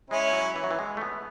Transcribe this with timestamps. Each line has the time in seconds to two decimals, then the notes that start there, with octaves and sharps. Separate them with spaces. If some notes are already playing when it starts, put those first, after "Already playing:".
0.10 G#3 C#4 E4
0.33 F#3
0.56 E3
0.64 F#3
0.71 E3
0.79 G#3
0.97 A3
1.01 B3